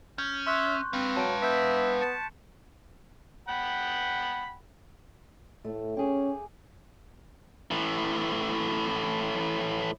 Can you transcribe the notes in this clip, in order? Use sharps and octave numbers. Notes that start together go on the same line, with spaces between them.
C#4 G6
E5 C6 C#6 F#6
C4 B4 F5
F#3 A5 D7
B3 E5 G6 B6
A5 C#7
F#5 G5 B5
A2 A3
C#4 G4 G#4
A2 E3